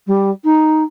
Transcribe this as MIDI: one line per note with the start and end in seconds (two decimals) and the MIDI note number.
0.06 0.30 55
0.44 0.83 63